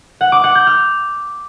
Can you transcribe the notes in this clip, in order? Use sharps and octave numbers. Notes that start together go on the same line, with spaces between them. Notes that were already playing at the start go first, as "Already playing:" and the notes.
F#5
D6
F#5
G6
F6